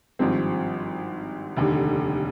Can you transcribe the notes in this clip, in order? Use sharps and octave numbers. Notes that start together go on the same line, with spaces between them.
G#1 G2 F3 C4
F1 D#2 D3